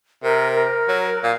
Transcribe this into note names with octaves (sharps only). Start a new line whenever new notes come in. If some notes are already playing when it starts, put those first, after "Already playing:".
C3 A#4
A#4
F#3
A#2 F5